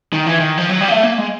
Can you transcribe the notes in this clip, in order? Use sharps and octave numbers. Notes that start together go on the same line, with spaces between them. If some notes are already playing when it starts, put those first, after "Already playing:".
D#3
E3
D#3
F3
F#3
G3
A#3
A3
A#3
G#3